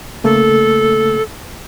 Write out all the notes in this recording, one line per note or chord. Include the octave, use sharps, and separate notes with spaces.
C#3 A3 A#3 A4